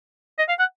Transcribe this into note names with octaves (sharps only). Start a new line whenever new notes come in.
D#5
F5
F#5